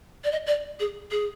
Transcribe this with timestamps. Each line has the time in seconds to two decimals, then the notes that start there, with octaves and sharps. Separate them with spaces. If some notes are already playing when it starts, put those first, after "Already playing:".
0.24 D5
0.32 D#5
0.47 D5
0.80 G#4
1.11 G#4